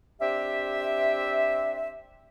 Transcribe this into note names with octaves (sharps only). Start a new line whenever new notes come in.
C4 D4 G4 E5